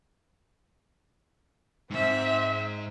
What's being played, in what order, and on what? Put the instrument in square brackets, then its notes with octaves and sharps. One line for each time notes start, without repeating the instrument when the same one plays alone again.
[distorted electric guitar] G#2 [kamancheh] C4 E5